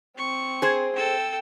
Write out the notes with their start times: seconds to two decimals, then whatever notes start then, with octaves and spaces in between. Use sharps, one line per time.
0.18 C4 C#6
0.62 G#4 C5
0.96 A4 G5 E6